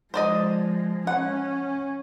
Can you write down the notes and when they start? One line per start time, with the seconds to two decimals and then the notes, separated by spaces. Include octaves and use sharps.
0.14 F3 G#3 C5 D5 D#5
1.07 C#4 F#5